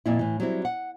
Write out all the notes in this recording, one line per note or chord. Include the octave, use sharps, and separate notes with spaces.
F2 A#2 E4
A2 E3
F#3 G3 C4 E4
F#5